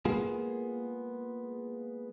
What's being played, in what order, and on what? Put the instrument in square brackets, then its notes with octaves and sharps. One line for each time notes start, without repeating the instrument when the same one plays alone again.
[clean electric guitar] G#3 A#3 B3 F4 G#4